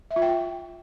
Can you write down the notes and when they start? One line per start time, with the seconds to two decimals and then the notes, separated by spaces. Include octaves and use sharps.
0.11 E5
0.16 F4
0.22 G5